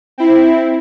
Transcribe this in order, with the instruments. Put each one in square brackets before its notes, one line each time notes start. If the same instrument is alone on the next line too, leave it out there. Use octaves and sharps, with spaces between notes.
[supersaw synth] C4 E4